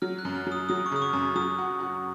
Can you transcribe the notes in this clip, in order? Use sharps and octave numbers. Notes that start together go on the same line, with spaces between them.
F#3 F6
F#6
F#2
F6
F#3
D#6
F#3 D#6
C#6
C#3 D#6
C#6
F#2
F#3 D#6
F#4
F#4